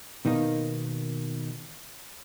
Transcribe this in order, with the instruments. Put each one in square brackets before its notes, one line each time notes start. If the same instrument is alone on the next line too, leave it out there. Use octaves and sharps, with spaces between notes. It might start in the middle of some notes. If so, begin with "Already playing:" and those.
[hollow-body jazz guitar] B2 D#3 A#3 D#4